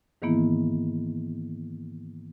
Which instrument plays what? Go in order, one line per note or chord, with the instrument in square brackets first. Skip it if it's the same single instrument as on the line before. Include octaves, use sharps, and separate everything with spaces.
[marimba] G#2 D#3 E3 A#3 B3 E4